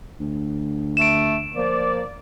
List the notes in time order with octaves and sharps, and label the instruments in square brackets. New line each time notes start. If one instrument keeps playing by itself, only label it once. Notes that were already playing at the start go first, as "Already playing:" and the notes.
[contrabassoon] D2
[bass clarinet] A3 [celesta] D7 E7
[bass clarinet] F3 [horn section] A#3 D5